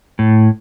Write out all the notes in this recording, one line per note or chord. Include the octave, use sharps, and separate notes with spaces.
A2